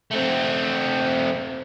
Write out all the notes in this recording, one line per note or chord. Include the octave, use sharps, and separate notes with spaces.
A3 C4